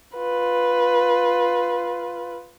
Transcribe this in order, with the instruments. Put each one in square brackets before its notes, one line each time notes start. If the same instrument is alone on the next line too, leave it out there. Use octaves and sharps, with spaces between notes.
[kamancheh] F4 B4